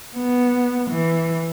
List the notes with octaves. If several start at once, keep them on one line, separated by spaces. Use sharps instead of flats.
B3
E3